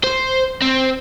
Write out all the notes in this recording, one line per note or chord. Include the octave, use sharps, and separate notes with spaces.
C5
C4